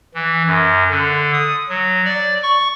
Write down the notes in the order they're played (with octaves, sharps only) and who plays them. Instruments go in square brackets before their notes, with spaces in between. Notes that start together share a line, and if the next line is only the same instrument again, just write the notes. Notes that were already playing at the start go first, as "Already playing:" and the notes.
[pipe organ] E3
F#2
D3
D#6
F#3
D5
C#6